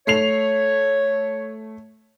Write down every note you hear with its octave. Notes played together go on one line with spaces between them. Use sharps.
A3 C#5 C7 F7